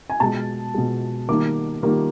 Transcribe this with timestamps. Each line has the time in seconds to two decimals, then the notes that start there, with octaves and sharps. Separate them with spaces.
0.10 G#5
0.20 B2 G#3 A5
0.74 B2 G#3
1.29 D#3 G3 A#3 D6
1.83 D#3 G3 A#3